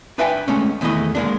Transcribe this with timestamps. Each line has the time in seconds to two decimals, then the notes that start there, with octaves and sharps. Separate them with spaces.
0.18 D4 B4 E5 F5 G5 G#5
0.48 G#3 A3 C#4
0.81 E2 D#3 A3 E4 D#5
1.15 G#3 A#3 D4